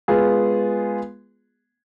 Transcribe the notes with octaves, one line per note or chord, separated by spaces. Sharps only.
G#3 B3 F4 G#4